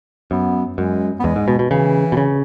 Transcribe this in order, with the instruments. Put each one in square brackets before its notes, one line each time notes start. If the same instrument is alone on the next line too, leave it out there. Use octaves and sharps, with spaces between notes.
[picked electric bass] F#2 [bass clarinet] B3
[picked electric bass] F#2 [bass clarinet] G#3
[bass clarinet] B3
[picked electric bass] E2 [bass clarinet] G#3
[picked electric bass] G#2
B2
B2
[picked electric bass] C#3 [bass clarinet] E3
[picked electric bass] B2
C#3